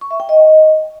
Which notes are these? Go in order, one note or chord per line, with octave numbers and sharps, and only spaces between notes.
C#6
E5
G5
D#5